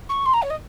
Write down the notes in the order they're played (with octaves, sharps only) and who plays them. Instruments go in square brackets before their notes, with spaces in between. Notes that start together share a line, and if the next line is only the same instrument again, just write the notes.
[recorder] C#6
C6
A#5
C#5
D#5